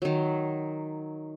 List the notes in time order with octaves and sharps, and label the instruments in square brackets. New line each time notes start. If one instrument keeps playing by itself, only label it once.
[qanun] D#3 F#3